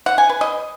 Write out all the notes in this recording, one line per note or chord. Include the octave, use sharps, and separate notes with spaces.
F#5
G#5
B4
D#5